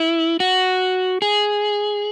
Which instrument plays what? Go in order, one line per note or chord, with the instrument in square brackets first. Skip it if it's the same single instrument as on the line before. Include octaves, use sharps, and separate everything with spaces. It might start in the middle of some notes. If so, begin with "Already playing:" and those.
Already playing: [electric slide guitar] E4
F#4
G#4